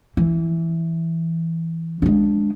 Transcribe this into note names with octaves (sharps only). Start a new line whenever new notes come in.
E3
G#3 D4